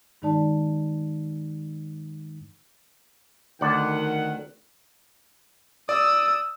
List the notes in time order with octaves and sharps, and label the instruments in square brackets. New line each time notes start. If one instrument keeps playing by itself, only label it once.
[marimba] G2 D#3 G#3 D#4 D5 A5
[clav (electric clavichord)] D2 D5 [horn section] D#3 F#5
[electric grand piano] D5 [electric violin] D#6 E6